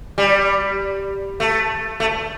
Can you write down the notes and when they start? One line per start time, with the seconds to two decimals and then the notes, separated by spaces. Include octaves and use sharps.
0.18 G3
1.40 A3
2.00 A3